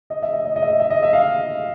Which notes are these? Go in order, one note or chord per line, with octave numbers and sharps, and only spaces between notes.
D#5
E5
D#5
D#5
D#5
E5
E5
D#5
E5
F5